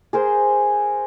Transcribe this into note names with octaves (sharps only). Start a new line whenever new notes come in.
G#4 A#4 C5